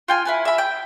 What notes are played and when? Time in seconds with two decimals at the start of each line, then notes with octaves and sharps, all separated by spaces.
0.08 F4 G5 G#5
0.25 E4 B4 G#5
0.45 E5 B5
0.58 G5